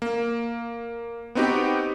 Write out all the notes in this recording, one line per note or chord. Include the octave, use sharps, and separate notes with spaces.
A#3
B3 C4 D#4 F#4 G4